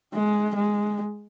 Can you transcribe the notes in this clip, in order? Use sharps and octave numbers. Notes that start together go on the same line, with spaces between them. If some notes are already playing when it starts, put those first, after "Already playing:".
G#3
G#3